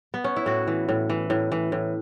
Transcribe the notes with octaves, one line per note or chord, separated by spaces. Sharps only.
B3
C#4
E4
A2 F#4
E3
A2
E3
A2
E3
A2